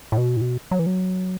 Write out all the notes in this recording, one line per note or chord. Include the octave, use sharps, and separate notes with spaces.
A2
B2
A2
B2
F#3
E3
F#3